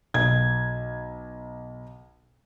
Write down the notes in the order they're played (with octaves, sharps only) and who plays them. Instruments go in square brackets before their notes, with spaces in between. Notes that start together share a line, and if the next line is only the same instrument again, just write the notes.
[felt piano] B1 G#6